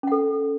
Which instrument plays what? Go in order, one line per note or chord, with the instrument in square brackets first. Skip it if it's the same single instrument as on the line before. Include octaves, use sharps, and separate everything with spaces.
[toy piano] C#4
F#5
A4